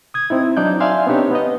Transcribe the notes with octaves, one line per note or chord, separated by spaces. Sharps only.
D#6 G#6
C4 D#4 E4
F#3 D4 D#4 D5 G6
D5 E5 F5 G#5 C6
B3 C4 D4 D#4 G4 C#5
B3 D#5